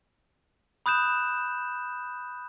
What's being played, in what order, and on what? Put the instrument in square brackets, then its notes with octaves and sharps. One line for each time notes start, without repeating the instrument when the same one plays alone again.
[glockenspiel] B5 D#6 F#6 G6 E7